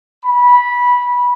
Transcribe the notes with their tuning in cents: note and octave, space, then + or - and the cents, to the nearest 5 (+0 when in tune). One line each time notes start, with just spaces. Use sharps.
B5 -15